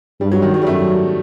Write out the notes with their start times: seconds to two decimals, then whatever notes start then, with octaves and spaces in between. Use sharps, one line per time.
0.20 G2 G3
0.31 F#3
0.42 D#3
0.54 F#3
0.62 G3
0.67 F#2 A3